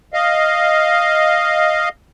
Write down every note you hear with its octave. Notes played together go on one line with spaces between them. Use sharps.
D#5 F5